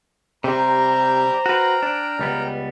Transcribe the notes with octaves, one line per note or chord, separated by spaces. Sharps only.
C3 G3 G4 C5 G5 A#5
F#4 A#4 B4 G5
D4
C#2 G3 B3